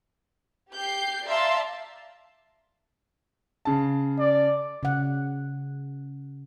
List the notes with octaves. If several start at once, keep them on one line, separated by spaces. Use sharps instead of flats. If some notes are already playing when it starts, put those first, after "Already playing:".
G4 G6 C7
D5 E5 F5 A5 A#5 C6
C#3 A5
D5
C#3 F#5